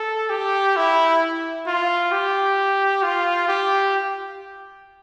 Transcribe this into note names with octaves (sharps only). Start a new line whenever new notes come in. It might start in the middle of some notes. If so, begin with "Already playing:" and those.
Already playing: A4
G4
E4
F4
G4
F4
G4